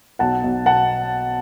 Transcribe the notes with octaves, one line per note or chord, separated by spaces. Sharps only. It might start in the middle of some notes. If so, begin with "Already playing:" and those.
B1 F#5 A5
B1
B2 F#5 A5